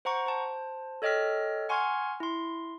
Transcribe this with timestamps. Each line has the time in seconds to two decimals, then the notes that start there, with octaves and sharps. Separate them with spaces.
0.05 C5 F#5 A#5 C#6
0.26 C5 A5
1.02 A4 C#5 D#5 G5 F6 B6
1.69 F#5 G#5 C6 C#6 F6 G#6
2.20 E4 C6